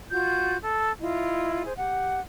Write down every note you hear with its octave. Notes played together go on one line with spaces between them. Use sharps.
F4 F#4 G6
A4
E4 F4 D#5
G#4 C5
G4 F#5